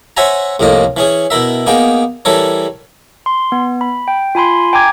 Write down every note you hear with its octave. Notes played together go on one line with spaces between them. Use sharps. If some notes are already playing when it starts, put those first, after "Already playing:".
C5 C#5 E5 F#5 G#5 A#5
C2 F2 A2 A#3 D#5
E3 C#4 G#4
B2 E4 A#4 E5
A#3 B3 D#4 G#4 G5
E3 G3 A4 A#4 C#5
C6
B3
B5
G5
F4 G#5 B5 C6
G5 G#5 A#5 D6 G#6